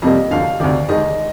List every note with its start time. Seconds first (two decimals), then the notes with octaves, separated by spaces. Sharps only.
0.02 F2 C3 G3 A#3 D#5
0.31 D2 D3 F3 F5
0.60 D2 C3 D#3 D5
0.89 D#2 D#3 G#3 D#5